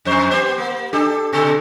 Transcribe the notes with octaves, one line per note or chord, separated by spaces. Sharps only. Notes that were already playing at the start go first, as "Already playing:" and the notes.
F2 C5
B3 G4 C5
A#3
D4 G4 A4
B2 D3 A4